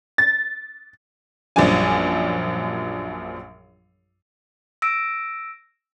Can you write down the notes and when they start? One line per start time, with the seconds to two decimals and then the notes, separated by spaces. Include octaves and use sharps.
0.18 A6
1.56 A#1 F#2 F3 G3 D4 G#5
4.82 E6 A#6 D7